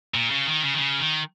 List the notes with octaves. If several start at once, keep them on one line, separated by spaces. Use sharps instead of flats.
A#2
C#3
D#3
C#3
D#3
C#3
D#3